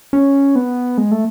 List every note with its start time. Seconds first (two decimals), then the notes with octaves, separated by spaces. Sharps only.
0.13 C#4
0.56 B3
0.98 G#3
1.11 A3